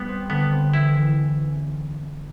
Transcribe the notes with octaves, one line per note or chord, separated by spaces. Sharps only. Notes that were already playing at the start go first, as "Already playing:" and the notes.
Already playing: G3 B3
C4
D3 B3
C4
E3 E4
E3